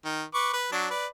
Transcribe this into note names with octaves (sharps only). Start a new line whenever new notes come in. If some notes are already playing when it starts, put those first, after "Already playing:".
D#3
B4 C#6 D6
B4
F#3 D4
B4 D5